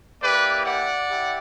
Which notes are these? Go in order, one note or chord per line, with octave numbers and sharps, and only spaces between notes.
A#3 E4 G4 B4 D5
D5 F#5
E4 G4